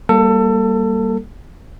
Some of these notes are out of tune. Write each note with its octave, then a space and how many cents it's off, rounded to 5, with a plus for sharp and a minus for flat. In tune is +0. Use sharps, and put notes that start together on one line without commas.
G3 +0 A#3 +0 A4 +25